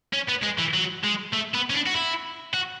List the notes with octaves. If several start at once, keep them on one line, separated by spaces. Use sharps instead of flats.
C#4
B3
G#3
E3
F#3
G#3
A3
B3
C#4
D4
F#4
E4
F#4